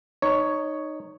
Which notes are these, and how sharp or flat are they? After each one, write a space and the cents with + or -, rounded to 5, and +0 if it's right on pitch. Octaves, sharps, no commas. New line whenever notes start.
D#4 -15 C#5 +5